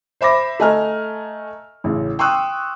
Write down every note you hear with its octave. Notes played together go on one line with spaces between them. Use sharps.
C5 E5 B5 D6 A#6
A3 D#5 G#5 A#5 F6
A1 C#3
G5 C6 C#6 D#6 E6 F#6